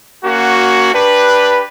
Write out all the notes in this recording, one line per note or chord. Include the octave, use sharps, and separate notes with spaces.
A#3 C#4 F#4
D4 G4 B4